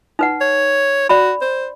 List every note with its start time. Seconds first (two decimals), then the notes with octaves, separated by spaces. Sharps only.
0.19 D#4 B4 F#5
0.41 C#5
1.09 F#4 D5 B5
1.41 C5